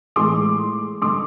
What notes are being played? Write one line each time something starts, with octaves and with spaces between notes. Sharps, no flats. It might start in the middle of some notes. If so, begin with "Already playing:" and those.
A2 E3 G#3 C6 D6
G2 D3 G3 C6 D6